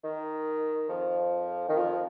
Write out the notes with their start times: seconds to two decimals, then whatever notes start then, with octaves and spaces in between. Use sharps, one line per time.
0.03 D#3
0.89 F2 F3
1.69 D#3
1.77 F2 F3